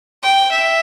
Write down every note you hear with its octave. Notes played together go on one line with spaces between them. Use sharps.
G5
E5